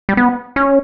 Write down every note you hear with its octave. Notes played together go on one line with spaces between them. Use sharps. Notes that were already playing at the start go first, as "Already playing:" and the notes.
G3
B3
C#4